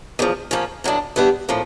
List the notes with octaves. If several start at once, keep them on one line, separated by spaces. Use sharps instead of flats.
E2 C#3 F3
F3 A#3 C#4
A2 F#3 B3 D4
E3 G3 B3 D4
A2 F3 A#3